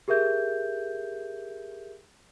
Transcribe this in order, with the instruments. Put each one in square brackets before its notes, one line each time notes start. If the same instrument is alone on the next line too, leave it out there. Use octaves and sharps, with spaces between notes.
[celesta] G4 G#4 A#4 E5 G6